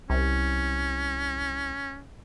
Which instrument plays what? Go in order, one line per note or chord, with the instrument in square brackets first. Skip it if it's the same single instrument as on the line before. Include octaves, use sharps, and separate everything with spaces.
[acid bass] C2 [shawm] C#4